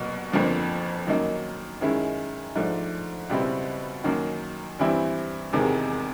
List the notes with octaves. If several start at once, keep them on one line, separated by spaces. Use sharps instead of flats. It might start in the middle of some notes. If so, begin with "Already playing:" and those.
Already playing: C2 B2 F#3 A#3
G1 F2 D3 F3 A#3
F#2 D#3 F#3 A#3 D#4
F#2 D#3 G#3 C#4 E4
G#2 F3 A3 D4
C#2 B2 G3 C4 E4
F#2 D#3 F#3 A#3
G2 E3 G3 C4 E4
E1 E2 C3 D#3 G#3